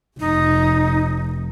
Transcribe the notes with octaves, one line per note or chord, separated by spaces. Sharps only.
F1 D#4